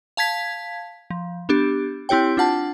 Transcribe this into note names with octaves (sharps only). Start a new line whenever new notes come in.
F5 A5 G#6 B6
F3
B3 D4 G4
C4 E4 G4 C#5 G5
D4 F4 F#5 A5